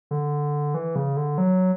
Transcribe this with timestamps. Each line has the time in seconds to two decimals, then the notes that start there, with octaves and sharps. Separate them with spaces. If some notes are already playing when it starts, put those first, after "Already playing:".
0.11 D3
0.74 E3
0.96 C#3
1.17 D3
1.38 F#3